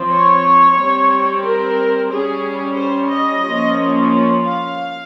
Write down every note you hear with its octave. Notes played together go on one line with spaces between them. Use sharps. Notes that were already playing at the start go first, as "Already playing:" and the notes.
Already playing: F3 C4
C#5
G3 C4
A#4
G3 C#4 G#4
C5
D#5
F3 A#3 C#4
F5